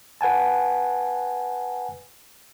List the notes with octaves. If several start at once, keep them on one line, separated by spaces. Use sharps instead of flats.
B4 F#5 G#5 A5